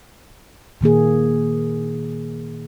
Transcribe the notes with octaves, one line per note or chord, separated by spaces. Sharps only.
A#2 D#3 A#3 G#4